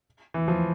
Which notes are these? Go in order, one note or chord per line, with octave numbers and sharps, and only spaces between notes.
E3
F3